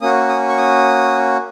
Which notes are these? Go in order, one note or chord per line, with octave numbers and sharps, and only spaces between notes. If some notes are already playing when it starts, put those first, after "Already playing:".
A#3 C#4 F#4 D#6
D#6
C#6
D#6